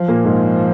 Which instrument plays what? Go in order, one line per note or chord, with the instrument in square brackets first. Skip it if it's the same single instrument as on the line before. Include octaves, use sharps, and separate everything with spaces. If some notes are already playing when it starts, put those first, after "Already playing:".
Already playing: [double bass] F3
[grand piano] A#2 A#3
G#2 G#3